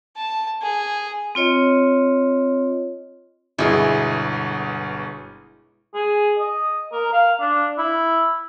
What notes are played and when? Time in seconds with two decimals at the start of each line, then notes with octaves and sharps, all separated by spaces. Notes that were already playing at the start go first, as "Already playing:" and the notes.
0.16 A5
0.61 G#4
1.35 C4 F4 C#5 D#5
3.59 G1 B2 G#3 E4 G#4
5.94 G#4
6.38 D#5
6.92 A#4
7.13 F5
7.41 D4
7.78 E4